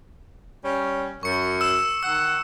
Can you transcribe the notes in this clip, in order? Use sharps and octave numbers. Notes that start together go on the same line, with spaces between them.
G3 C#4
F#2 C#6 C#7
E6 E7
D#3 F#5 E6